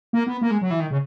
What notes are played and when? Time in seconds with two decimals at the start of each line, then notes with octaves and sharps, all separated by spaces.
0.13 A#3
0.27 B3
0.42 A#3
0.51 G#3
0.62 F#3
0.71 E3
0.80 D#3
0.91 C#3